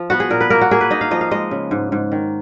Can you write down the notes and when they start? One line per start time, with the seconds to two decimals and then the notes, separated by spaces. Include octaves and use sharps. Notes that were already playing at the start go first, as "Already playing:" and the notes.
Already playing: F3
0.10 B3 F#4
0.20 G#4
0.30 A#2 A#4
0.41 B4
0.50 A#3 A#4
0.61 F#4
0.71 A#3 G#4
0.81 B4
0.91 D#4 D#5
1.01 F5
1.11 F3 D#5
1.21 F5
1.31 G#3 D#5
1.51 C#3
1.71 G#2
1.92 G#2
2.12 D#3